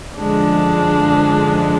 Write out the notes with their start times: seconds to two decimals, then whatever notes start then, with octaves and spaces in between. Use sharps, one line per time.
0.20 F#2 D3 F3 G#3 D4